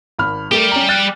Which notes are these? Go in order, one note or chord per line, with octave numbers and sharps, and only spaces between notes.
G#1 B5 F6
G3 A3 G4 A#4
C#4 A#5
F6 F#6 A6